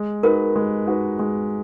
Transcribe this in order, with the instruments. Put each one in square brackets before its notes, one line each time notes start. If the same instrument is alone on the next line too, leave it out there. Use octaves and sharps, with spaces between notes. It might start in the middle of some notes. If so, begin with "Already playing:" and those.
Already playing: [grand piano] G#3
[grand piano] D#4 F#4 B4 [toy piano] A#4
[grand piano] G#3
D#4 F#4 B4
G#3